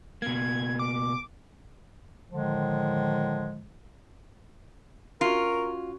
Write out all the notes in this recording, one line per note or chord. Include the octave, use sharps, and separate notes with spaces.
B2 A#3 G#6
D6
A2 D3 D#3 F3 G#3
C#4 F4 F#4 A#4